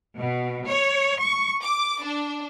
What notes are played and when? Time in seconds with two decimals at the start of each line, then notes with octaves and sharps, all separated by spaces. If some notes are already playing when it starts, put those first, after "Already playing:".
0.17 B2
0.66 C#5
1.20 C#6
1.62 D6
2.02 D4